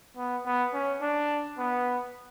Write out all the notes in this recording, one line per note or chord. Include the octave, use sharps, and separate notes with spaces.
B3
B3
C#4
D4
B3